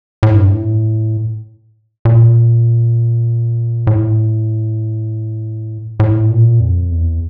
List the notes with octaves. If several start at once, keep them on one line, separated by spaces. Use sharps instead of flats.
A2
G2
A2
A#2
A2
A2
A#2
F2
E2